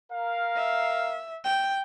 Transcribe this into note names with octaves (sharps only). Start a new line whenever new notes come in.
A#4 F5
E5
G5